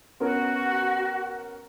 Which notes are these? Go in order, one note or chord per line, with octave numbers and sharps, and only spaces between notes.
B3 C#4 F#4 A#4